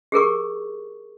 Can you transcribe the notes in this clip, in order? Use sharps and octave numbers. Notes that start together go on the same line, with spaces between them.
G4 G#4 A#4 C#6